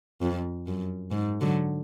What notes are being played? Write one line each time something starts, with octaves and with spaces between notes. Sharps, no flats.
F2
F#2
G#2
D3 F#3